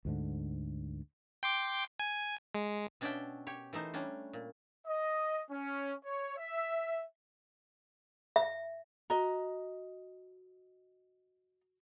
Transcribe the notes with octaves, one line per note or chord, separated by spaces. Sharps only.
D2 G#2 D3
G5 C6 D6
G#5
G#3
B2 C#4 D4 D5 E5 G5
G4 C#5
E3 A3 D#4 C5
G3 C#4 D4
A#2
D#5
C#4
C#5
E5
E5
F#4 D#5 A#5